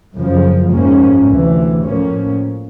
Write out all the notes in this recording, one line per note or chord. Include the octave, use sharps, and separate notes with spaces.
F#2 C#3 F3
G#2 F3 A#3 C#4
D2 C3 E3
A2 F3 A#3 C#4